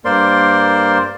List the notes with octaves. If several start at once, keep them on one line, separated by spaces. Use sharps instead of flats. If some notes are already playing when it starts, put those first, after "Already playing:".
G2 A#3 A#4 C5 D5 C6